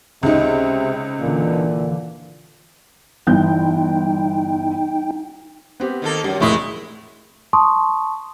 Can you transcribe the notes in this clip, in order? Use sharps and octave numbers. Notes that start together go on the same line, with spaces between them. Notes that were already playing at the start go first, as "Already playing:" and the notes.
C#2 C3 D#4
A#2 D3 E3
G1 E3 D#4 G5 G6
B3 C4 G4
D#3 A#3 A4
F#2 G3
F1 A#2 G#3 A3 E4 D#6
A5 C6 C#6 D#6